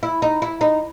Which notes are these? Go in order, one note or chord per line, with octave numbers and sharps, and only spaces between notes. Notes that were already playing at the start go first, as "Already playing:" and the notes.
E4
D#4
E4
D#4